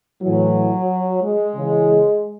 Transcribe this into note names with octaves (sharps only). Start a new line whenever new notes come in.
A2 E3 F#3
G#3
C#3 E3